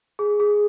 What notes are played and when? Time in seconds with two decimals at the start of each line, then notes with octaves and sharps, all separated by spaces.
0.19 G#4
0.40 G#4